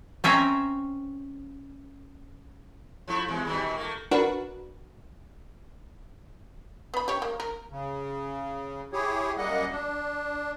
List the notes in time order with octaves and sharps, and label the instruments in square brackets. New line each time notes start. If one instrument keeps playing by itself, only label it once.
[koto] C4 C#4 E5 A#5
[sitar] F3 A3 E4
B2 E3 G#3
A#2 D#3 G3
A3 A#3
[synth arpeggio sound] D4 F#4 A#4 B4
[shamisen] B3 B5
G4 C#5
A#3
A#4
[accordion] C#3
E4 G4 G#4 C#5
F#2 G3 A#3 D#5 F#5
D4